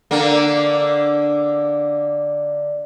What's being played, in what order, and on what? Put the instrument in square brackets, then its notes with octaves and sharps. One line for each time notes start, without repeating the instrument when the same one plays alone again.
[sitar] D3 A#3